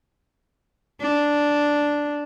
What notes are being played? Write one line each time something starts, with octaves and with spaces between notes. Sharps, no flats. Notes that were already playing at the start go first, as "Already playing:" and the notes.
D4